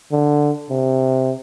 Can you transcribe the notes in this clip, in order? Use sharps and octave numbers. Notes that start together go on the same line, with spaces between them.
D3
C3